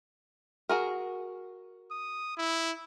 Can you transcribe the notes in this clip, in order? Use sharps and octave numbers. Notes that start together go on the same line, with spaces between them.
F#4 G#4 A#4
D#6
E4